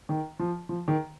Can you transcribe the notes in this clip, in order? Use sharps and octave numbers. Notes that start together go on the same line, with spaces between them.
D#3
F3
F3
D#3